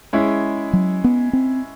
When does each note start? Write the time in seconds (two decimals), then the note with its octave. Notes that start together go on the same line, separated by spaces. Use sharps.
0.13 G#3 C#4 E4
0.73 F#3
1.04 B3
1.33 C4